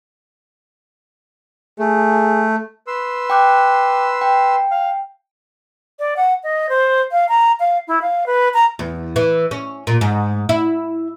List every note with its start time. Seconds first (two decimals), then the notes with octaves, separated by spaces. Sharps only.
1.79 A3 G#4
2.87 B4 C6 E6
3.30 G5 D6 F#6
4.21 G5
4.71 F5
5.99 D5
6.17 F#5
6.43 D#5
6.69 C5
7.12 F5
7.29 A#5
7.60 F5
7.88 E4
8.02 F5
8.27 B4
8.54 A#5
8.79 E2
9.16 E3
9.51 C#4
9.87 A#2
10.01 G#2
10.49 E4